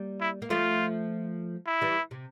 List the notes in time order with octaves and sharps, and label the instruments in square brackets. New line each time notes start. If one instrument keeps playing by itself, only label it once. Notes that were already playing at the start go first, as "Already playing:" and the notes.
Already playing: [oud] G3 A#3
[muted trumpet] E4
[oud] A#3
[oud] F3 A3 [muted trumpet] F4
[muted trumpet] E4
[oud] E3 G3
C3